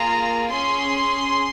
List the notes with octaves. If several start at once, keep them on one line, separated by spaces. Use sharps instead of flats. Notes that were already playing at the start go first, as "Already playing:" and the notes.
Already playing: A#3 F4 G#4 A#5
C#4 G#4 C6